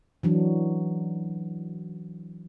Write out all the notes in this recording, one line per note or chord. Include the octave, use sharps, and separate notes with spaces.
E3 F#3 D4